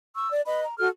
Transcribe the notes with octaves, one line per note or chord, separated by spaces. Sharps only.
C#6 E6
D5
B4 D#5 B5
A#5
F#4 A4 F6